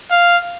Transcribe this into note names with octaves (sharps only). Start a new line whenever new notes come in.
F5